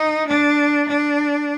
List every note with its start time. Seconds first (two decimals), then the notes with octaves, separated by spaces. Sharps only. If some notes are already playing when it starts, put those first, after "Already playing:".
Already playing: D#4
0.27 D4
0.88 D4